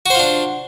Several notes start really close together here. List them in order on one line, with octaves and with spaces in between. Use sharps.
F#4 C5 F4 D4